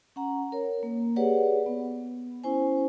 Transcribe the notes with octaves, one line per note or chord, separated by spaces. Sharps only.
C#4 F#5 A#5
A#4 C#5
A#3
G4 G#4 B4 C#5 D5 F#5
B3
C#4 E4 C5 G#5